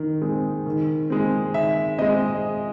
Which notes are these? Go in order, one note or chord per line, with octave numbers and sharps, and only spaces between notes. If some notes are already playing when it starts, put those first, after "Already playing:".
Already playing: D#3
G#3 C4
D#3
G#3 C4
D#3 E5
G#3 C4 D#5